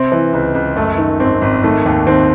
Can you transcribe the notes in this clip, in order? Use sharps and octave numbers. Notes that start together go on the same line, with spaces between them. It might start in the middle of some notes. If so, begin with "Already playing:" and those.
Already playing: C3 C4
E3
C#2
C#2
F#2 A3
D#3
G#1 C4
G#1
D#3 A3
D#2
D#3 C4